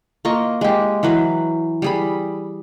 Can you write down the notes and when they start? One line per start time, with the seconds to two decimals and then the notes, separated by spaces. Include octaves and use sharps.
0.25 A#3 F4 D#5 C#6
0.61 G#3 G4
1.03 E3 F#3 B4
1.82 G3 G#4 B5